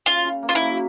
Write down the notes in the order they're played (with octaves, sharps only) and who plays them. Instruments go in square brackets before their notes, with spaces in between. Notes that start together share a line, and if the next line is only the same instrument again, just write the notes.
[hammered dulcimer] C#3 [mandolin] F4
[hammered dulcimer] C#3
A#3
[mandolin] F4
E4
[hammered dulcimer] F#3